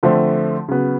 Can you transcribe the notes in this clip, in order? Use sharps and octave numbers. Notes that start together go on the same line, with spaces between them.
D3 F3 A3 C4
C#3 F#3 B3